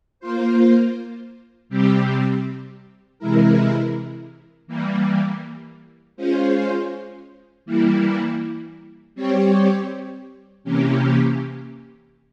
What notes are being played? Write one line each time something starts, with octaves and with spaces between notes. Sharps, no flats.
A#3 F4 C5
C3 G3 C4 G4
C3 E3 G#3 E4 A#4
E3 G3 A#3
G#3 C#4 F4 C5
E3 G3 A#3 E4
G3 C4 G4 C#5
C3 E3 A#3 C#4 G4